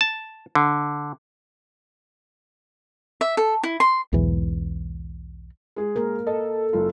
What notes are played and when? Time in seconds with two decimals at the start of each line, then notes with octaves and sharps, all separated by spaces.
0.01 A5
0.55 D3
3.21 E5
3.37 A4
3.63 E4
3.80 C6
4.13 B1 E2 G#2 E3
5.76 G#3 G#4
5.96 A#3 A#4
6.27 A4 D#5
6.73 F#1 F4